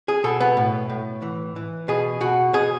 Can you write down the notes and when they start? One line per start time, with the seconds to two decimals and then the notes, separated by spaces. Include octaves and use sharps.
0.08 G#4
0.24 B2 A4
0.40 B3
0.57 A2
0.90 A2
1.22 E3
1.56 E3
1.88 B2 G#4
2.21 B2 F#4
2.53 B2 G#4